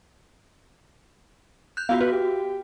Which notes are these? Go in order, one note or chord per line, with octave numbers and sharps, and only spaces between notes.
F#6 G6
B3 F4 F#4 F5
F#4 B4
G4